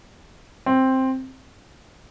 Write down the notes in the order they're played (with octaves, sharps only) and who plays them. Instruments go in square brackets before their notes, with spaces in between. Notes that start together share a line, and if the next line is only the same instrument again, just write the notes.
[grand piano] C4